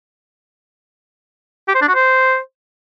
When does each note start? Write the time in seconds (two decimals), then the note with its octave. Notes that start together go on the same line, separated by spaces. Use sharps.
1.68 G4
1.75 C5
1.81 D4
1.88 F#4
1.95 C5